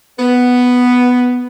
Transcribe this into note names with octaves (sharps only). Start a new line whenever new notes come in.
B3